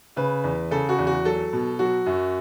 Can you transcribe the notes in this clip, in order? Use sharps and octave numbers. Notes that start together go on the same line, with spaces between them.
C#3 B4
E2
C#3 A4
F#4
E2
F#4
F#3 A4
B2
F#3 F#4
F#2